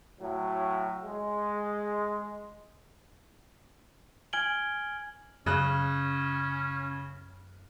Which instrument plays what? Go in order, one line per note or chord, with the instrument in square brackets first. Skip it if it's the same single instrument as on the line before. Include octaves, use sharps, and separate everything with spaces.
[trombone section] A2 F#3
G#3
[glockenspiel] G#5 F6 G#6 D7 F#7 G7
[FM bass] F#2 [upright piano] C#3 F#6 [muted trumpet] C#4